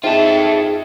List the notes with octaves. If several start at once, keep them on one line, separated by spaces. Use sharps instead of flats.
D#4 F4 G#4 A4 C5 E5 G5